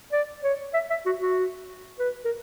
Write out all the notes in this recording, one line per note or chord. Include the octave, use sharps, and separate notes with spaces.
D5
C#5
E5
E5
F#4
F#4
B4
A#4